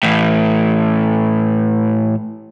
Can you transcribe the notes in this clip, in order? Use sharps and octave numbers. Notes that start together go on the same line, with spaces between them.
A2 E3